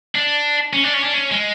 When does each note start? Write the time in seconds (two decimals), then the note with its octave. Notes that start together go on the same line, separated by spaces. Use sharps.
0.16 D4
0.73 C#4
0.84 D4
0.94 C#4
1.04 D4
1.14 C#4
1.31 G#3